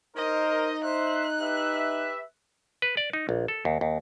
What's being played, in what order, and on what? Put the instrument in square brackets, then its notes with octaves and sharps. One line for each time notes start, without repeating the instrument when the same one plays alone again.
[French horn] D#4 [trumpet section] A#4 C5 [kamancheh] D#5
[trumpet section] C5 E5 [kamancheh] F#6
[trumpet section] G4 B4 E5
[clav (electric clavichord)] B4
D5
D#4
A#1
A4
D#2
D#2